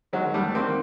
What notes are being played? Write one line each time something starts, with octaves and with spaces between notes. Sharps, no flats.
D#3 F#3 G#3
E2 G3 A3
D#3 A#3 C4